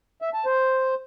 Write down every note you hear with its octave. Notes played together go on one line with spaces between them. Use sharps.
E5
A5
C5